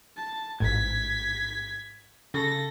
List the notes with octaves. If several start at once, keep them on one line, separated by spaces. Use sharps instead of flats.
A5
A1 G#2 G#6 B6
C#3 A4 A#6